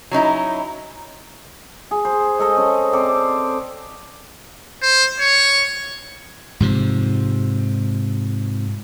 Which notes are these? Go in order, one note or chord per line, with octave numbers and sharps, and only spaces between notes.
F#3 C#4 D#4 E4
G#4
C5
G#3 A4 D#5
C#4 C5 C#5
C4 A4 C5 D5
C5
C#5
G#2 C3 F3